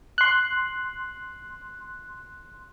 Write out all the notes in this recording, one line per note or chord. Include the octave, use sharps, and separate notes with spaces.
C6 F#6